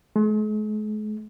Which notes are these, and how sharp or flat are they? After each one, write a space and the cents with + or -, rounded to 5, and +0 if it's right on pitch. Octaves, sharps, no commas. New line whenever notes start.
G#3 +45